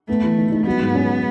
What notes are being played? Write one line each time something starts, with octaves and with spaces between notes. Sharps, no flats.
A3 B3
E3
D#4
D#4
F#3 B3
G#2
C#4